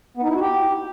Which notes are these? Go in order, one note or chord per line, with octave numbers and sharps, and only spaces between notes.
B3
D#4
E4
F#4
G4